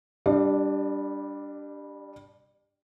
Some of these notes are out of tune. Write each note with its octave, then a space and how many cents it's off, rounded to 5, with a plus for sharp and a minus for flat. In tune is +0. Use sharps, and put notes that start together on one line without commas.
G3 +0 D4 -5 D5 +40